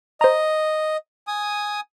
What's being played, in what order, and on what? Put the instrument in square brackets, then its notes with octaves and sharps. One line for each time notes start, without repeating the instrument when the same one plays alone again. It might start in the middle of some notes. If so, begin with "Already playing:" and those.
[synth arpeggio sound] C5 A#5 [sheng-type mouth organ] D#5
[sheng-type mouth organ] G#5 D#6